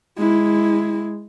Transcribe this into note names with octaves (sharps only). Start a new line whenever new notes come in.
G#3 E4